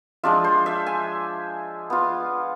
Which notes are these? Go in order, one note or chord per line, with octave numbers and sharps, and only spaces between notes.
F3 G#3 D4 F4 E5
C5
E5
G#5
B3 F4